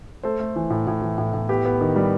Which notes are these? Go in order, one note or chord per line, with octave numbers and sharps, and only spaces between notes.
A3 A4 C5
A3
E3
A2
A2
E3
A2
A2
B3 G4
B3
D#3
G3